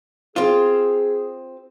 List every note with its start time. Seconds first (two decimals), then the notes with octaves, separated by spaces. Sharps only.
0.36 C4 F4 G#4